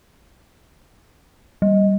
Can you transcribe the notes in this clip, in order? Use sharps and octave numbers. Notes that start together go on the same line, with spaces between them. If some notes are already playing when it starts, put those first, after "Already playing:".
G3